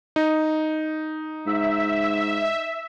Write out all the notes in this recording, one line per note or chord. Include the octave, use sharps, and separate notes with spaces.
D#4
G#2 E5